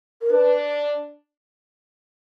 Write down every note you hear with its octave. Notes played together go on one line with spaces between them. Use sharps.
A#4
D4 B4